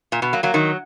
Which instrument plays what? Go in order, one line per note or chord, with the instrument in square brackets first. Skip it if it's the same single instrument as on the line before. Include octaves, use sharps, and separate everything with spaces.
[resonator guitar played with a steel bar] A#2
B2
F#3 A#3
F#3 A#3
D#3 F#3